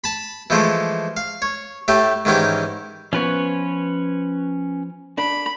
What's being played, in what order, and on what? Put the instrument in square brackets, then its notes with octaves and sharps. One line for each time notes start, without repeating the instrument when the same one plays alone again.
[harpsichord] A5 B5
E3 F3 G#3 A3
F5
C#5
A2 A3 G4
G#2 D#3 E3 C#4 G4
[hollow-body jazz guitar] F3 B3 [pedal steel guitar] C#4 B4 C#5
[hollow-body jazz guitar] D4 [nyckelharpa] B5